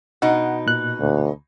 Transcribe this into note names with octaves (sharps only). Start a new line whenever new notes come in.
B2 D#4 F#5
A#2 F#6
D2